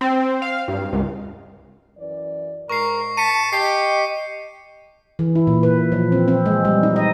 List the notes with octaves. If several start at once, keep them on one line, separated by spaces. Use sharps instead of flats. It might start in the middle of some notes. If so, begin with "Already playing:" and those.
C4
F5
G2
C#2
F#2 E3 D5
G#2 A#4 C#6 C7
A5 B6 C#7 D#7
G4 D#5 C7
E3
E4
A#2
B4
F3
C4
C4
G#3
G3
D#4
D#5